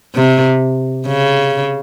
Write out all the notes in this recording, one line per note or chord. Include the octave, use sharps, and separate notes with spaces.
C3
C#3